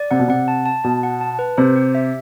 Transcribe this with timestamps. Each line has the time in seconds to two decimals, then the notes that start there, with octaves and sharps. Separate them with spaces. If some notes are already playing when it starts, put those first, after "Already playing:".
Already playing: D5
0.11 C3 F#5
0.19 B2
0.28 C3 F#5
0.48 A5
0.66 A5
0.84 B2 A5
1.03 F#5
1.21 A5
1.39 B4
1.58 C3 C5
1.76 G4
1.95 E5